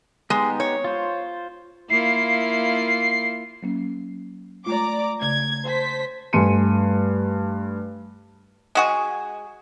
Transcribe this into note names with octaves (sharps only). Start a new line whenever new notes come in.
G#3 B3 D#4 G4
C#5
F4 C5
A#3 E4 F4 C7
F#3 A#3 C#4
G#3 A3 F4 D5 A#5 D6
C#3 A3 G#6
C5 A5 B6
G2 A3 G#5 C6 C#7 D#7
G#3 F#4 G#4